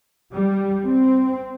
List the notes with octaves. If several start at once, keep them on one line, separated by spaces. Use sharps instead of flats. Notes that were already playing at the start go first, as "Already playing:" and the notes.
G3
C4